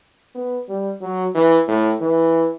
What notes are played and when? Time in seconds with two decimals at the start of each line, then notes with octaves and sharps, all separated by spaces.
0.35 B3
0.68 G3
1.01 F#3
1.35 E3
1.68 A2
2.01 E3